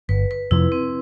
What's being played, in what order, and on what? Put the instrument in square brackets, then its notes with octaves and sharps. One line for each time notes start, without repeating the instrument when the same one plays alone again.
[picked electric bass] G1 [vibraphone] B4
[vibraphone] B4
[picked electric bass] F2 C3 F3 [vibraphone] E4
[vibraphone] C4